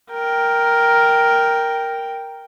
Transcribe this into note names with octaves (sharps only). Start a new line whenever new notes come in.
A#4 G5